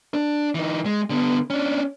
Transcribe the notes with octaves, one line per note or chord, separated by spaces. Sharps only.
D4
E3 D#4
G#3
D3 B3
C#4 D4